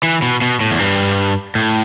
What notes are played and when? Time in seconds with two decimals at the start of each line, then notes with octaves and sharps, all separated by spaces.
0.03 E3
0.22 B2
0.42 B2
0.61 A2
0.71 E2
0.79 G2
1.55 A2